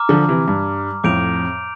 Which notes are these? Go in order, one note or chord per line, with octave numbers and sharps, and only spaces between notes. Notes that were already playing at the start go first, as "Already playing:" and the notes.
Already playing: A#5 D6 F6
D3 F3
C3 E3
G2
F2 A2 D6 G6 D7 F7